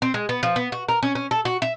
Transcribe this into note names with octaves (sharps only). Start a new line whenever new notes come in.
C4
G#3
B3
F3
B3
F#4
A#4
C#4
C#4
A4
F#4
E5